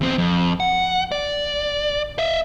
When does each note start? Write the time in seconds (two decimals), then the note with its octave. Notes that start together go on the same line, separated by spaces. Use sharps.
0.01 E2 C4
0.18 F2
0.60 F#5
1.12 D5
2.19 E5 F5